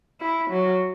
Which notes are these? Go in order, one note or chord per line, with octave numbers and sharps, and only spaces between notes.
E4
F#3